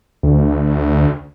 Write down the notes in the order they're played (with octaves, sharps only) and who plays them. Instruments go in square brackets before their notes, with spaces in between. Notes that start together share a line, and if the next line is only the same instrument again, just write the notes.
[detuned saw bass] D2